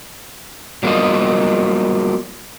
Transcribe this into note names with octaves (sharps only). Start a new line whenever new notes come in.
F#3 G3 A#3 B3 F4 D#5